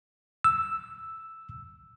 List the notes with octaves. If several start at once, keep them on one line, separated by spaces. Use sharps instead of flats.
E6